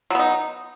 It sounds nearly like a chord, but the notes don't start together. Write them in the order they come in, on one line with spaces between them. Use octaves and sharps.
F#3 B3 D#4